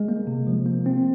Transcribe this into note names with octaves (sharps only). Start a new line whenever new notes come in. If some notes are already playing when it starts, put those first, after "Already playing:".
Already playing: G#3
A#3
C3
F3
A#3
C4